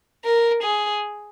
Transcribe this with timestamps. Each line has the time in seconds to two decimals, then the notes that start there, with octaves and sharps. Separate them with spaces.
0.24 A#4
0.63 G#4